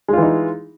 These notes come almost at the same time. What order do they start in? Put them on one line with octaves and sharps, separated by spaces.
G#3 F4 E3 D#4